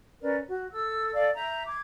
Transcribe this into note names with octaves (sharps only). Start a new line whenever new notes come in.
C#4 A#4 B4 D5
F#4
A4 E6
A4 D5 F5
E5 A#5 G6
D6 G#6